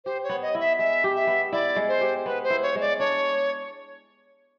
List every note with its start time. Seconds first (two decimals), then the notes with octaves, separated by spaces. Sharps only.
0.05 G4 C5
0.24 C#5
0.29 B3
0.42 D#5
0.55 E4
0.60 E5
0.78 G#3 E5
1.04 G4
1.15 E5
1.27 B3
1.52 E4 D5
1.76 G#3
1.88 C5
2.01 G4
2.26 B3 B4
2.44 C5
2.50 E4
2.63 C#5
2.75 G#3
2.81 D5
2.99 D4 C#5